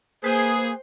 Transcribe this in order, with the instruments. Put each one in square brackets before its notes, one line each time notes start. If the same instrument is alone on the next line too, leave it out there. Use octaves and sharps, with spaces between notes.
[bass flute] A#3 [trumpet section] G#4 [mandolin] B4 G5 G#5 [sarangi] C5